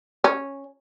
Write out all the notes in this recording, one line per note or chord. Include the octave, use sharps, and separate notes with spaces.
C#4